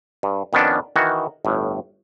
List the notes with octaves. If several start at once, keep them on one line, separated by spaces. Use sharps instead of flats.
G2
F2 D#3 B3 C#4 D4
D#3 E3 F#4
G1 A2